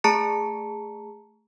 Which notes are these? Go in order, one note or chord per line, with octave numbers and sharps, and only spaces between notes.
A3 G#4 A5 A#5 C#7